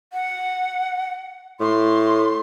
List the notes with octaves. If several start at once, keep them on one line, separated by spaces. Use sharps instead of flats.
F#5
A2 C6